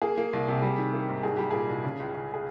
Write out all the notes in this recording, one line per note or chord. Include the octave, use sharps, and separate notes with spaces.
A#3 G#4
A#3
C2
C3
G3
D#3
A#3
G#2
C2 G#4
G3 G4
A#2 G#4
C2
C#3
C#2
C#2
G#4